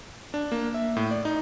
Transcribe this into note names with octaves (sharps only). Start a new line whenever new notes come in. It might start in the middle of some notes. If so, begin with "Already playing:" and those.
D4
A#3
E5
A2
D5
D#4